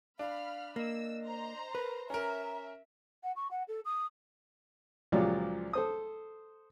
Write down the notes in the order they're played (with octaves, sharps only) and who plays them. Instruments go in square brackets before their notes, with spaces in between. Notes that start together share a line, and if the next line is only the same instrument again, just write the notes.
[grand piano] D4 [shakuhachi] F5 [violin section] B5 F6
[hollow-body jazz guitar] A#3 [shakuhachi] D#5 [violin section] E6
[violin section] C5 A#5 C6
[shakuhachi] A#4 [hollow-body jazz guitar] B4
[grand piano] C#4 A#4 [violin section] E5 [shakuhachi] A#5
[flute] F#5
C#6
F#5
A4
D#6
[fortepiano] C#2 A#2 F3 F#3 G4 D5
A4 C5 D#6